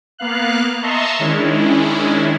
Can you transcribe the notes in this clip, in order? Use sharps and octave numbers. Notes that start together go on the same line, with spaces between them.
A#3 B3 F5 F#6
D#5 E5 A5 A#5 C6 C#6
D#3 G#3 C#4 D4 E4